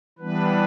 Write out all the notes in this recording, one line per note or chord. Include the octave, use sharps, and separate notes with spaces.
E3 G3 B3 D4 B4